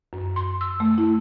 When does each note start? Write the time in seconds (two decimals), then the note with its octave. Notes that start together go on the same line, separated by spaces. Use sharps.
0.13 F#2
0.36 C6
0.61 E6
0.80 A3
0.98 E4